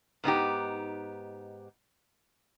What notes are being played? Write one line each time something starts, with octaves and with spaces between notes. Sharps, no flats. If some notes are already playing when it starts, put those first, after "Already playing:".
G#2 B3 D#4 G4